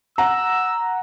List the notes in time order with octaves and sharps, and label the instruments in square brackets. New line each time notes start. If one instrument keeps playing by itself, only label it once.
[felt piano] F#5 A#5 [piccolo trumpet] E6